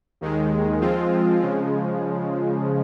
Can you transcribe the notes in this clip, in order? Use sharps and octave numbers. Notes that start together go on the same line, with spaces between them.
D#2 D#3 G#3
F3 G#3 C4 F4
C#3 F3 G#3